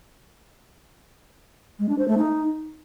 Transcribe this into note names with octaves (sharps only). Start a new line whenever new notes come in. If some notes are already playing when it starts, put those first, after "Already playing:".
G#3
D4
C5
A3
D#4